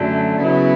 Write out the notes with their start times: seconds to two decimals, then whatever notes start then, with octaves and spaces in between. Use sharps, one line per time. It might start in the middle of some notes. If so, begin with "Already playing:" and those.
Already playing: F#2 D3 F#3 A3
0.42 C#3 F#3 B3 E4